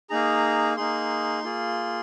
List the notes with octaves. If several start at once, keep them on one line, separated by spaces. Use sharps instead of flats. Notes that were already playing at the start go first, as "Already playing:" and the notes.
A#3 D#4 G#4 A#5
A#3 D#4 G#4 C6
A#3 F4 G#4